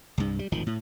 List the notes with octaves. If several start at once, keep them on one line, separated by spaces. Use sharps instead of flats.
C2 G2
G3
D1 G#1 D#3 F3
A2